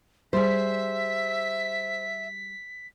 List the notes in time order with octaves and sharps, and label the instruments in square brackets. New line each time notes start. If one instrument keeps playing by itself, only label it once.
[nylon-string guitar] G3 G#4 [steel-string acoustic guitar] C5 [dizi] E5 [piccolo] B6